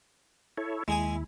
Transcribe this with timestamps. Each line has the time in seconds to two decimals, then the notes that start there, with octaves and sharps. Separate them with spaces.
0.57 E4 A4 C#5
0.88 D#2 G#3 E4 G#4 G#5